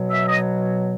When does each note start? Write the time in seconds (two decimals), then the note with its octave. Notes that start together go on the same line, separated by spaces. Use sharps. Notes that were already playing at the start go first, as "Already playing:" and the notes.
Already playing: B2 F#3
0.10 E5
0.29 D#5